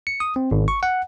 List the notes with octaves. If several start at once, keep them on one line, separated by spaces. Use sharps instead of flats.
C#7
D#6
C4
G#1
C#6
F#5